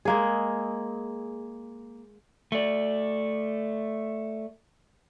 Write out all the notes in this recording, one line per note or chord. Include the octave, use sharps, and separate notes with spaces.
G#3 A#3 G#4
A3 D5